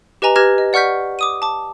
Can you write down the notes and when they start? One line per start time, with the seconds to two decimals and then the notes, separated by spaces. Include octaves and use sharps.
0.22 G4 B4 D#5 G#5 A#5
0.36 G4 B4 F6 G#6 A#6
0.58 D#5
0.73 D5 F#5 C#6 F6 G6 B6
1.19 D6 D#6 D#7
1.42 A5 D6